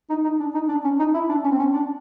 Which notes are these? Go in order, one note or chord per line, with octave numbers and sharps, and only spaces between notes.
D#4
D#4
D4
D#4
D4
C#4
D#4
E4
D4
C#4
C4
C#4
D4